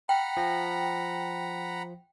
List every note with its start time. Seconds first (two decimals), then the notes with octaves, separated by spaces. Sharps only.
0.09 F#5 G5 A#5 B5
0.37 F3 A#6